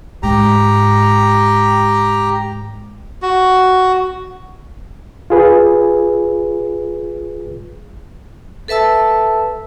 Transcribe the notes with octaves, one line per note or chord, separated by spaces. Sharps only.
G#2 G4 A#5
F#4
F4 G#4 B4
A4 B4 E5 A5 E6